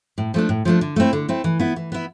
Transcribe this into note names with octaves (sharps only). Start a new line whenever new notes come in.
A2
F3 A3 D4
A2
F3 A3 D4
D3
A3 C4 E4
D3
A3 C4 E4
E3
B3 E4
E3
B3 E4